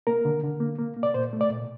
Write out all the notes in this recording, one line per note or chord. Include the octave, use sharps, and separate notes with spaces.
A#3 A#4
D3
D3
A#3
A#3
A#3
D5
A#2 C5
A3
D5
A#2